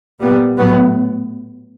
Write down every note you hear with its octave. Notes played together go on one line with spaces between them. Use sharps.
A#2 G3 B3
A2 F#3 B3